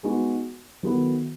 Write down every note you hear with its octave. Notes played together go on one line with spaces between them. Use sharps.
G#3 B3 D#4 F#4
D#3 F#3 B3 E4 A4